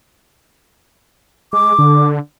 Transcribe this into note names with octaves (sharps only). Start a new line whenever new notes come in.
G#3 D6
D3